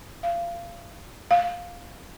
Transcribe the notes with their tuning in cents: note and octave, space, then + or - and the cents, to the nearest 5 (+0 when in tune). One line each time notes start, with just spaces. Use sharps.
F5 -25
F5 +10